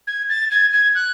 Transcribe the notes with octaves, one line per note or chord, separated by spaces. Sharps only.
G#6
A6
G#6
G#6
F#6